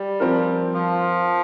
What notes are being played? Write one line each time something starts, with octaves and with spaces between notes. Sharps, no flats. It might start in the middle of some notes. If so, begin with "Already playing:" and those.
Already playing: G3
F3 C4 F4 A#4
F3